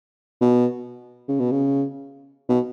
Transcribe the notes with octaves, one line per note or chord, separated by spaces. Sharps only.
B2
C#3
B2
C#3
B2